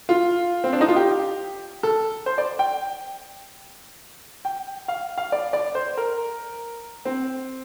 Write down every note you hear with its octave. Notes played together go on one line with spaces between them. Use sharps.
F4
C4
D4
D#4
F4
G4
A4
C5
D5
G5
G5
F5
F5
D5
D5
C5
A#4
C4